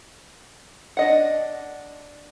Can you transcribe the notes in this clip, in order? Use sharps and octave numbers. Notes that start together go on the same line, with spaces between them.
D4 D#5 F#5